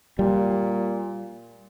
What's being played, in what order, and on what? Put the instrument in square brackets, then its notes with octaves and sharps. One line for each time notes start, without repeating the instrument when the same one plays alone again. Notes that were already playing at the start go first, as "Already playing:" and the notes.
[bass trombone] A#2 [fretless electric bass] G3